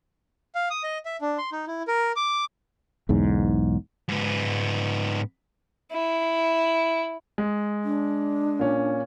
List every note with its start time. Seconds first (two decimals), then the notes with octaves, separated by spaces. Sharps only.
0.55 F5
0.70 D#6
0.83 D#5
1.05 E5
1.21 D4
1.38 C6
1.52 D#4
1.67 E4
1.88 A#4
2.16 D6
3.09 B1 E2 G#2
4.09 G#2 B3
5.92 E4
7.38 G#3
7.84 D4
8.59 A#2 C#4